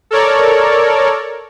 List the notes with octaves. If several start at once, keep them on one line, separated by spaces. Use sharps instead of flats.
A4 A#4 C#5 D5